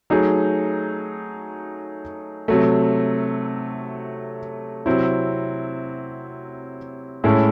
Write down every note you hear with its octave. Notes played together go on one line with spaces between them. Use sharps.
F#3 A3 D#4 G#4
C3 F#3 A3
C3 F#3 C4 E4
A2 G#3 C#4 E4 A4